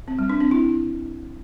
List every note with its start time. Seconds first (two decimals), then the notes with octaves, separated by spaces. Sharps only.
0.08 C4
0.19 G3
0.30 D4
0.40 C4
0.51 E4